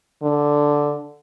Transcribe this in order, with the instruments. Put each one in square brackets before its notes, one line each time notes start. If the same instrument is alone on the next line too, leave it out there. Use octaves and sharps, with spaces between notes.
[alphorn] D3